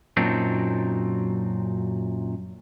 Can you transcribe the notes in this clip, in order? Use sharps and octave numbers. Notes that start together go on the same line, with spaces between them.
F#2 A#2 F#3 C4 D4 D#4